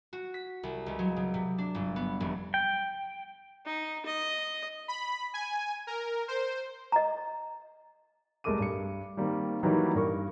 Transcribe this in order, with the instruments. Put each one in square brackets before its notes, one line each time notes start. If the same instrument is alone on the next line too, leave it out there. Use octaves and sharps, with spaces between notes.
[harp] F#4
B6
C2
C#2
F#3
C#3
C3
D4
G1
B3
F1
[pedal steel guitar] G5
[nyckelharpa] D#4
D#5
[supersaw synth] B5
G#5
A#4
C5
[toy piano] D#5 A#5
[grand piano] C2 G#3 A3 A#4 D6 D#7
G2 C#7
D#3 G3 A#3 C4
D#3 E3 F#3 G3 A#3 D#4
G2 A#4 C#6